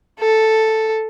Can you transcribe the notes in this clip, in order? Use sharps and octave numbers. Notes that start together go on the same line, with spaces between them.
A4